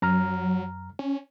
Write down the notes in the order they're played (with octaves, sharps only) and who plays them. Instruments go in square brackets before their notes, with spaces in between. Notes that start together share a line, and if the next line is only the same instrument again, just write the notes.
[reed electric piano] F#2 A#5 F6 [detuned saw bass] F#3
[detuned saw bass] C#4